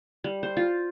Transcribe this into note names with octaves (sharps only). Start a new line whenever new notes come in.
G3
C5
F4